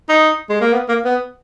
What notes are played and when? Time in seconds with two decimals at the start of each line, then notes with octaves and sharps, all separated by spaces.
0.09 D#4
0.49 G#3
0.61 A#3
0.73 B3
0.88 A#3
1.05 B3